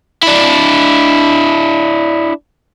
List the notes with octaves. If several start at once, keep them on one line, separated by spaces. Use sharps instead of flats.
D4 E4